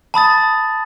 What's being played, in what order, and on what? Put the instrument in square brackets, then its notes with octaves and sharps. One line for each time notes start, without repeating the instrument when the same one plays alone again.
[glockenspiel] A5 B5 D#6 A6